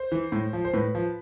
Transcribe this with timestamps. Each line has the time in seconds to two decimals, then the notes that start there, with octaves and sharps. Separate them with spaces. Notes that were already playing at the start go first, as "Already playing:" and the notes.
Already playing: C5
0.12 E3
0.32 A2
0.53 F3
0.65 C5
0.73 A2 B4
0.95 F3